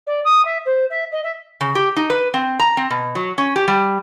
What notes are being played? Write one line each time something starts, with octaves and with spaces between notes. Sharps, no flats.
D5
D#6
E5
C5
E5
D#5
E5
C#3
G4
D#4
B4
C4
A#5
C4
B2
F#3
C#4
G4
G3